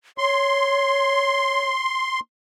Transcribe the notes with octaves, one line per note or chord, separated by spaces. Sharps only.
C#5 C6